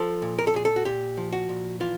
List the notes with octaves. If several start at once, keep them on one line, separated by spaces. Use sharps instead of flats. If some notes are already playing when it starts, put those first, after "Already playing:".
Already playing: F3 A4
A#2
A#4
A4
A#2 G#4
A4
F#4
A#2 G4
F3
F#4
A#2
E3 F4